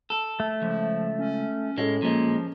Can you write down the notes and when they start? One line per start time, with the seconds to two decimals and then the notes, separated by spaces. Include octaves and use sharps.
0.10 A4
0.40 A3
0.62 C#2 F3
1.19 C#4
1.78 A2 G#3 C#4 A4
2.02 A#2 F3 G#3